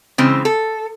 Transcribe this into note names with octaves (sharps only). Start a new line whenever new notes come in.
C#3 E3 G#3 C4
A4